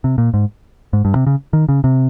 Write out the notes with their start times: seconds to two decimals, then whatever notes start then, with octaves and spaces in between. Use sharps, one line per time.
0.04 C3
0.18 A#2
0.34 G#2
0.93 G#2
1.05 G2
1.16 C3
1.27 C#3
1.53 D#3
1.69 C#3
1.84 C3